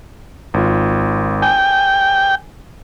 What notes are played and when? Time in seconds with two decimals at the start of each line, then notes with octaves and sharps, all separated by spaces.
0.54 G#1 F4
1.42 G5 G#5